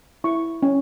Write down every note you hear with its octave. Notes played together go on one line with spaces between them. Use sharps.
E4 C#6
C#4